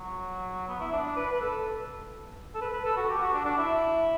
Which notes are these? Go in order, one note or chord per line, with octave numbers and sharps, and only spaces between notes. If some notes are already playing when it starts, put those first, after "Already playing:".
Already playing: F#3
B3
E4
D4
B4
B4
A4
A4
B4
B4
A4
F#4
G4
F#4
D4
D4
E4